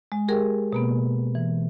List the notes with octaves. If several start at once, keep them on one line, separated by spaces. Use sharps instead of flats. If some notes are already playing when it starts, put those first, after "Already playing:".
G#3
G4 G#4 A#4 G5
B2 A#3 B3
E3